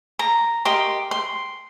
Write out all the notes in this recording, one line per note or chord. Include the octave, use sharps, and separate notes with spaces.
A#5
G4 A#4 D#5 C6
C6